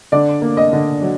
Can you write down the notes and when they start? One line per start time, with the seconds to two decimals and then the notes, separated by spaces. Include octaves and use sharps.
0.12 D3 D5
0.42 A#3
0.57 D#5
0.73 D3
1.02 F#3